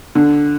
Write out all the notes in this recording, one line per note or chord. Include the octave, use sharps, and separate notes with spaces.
D3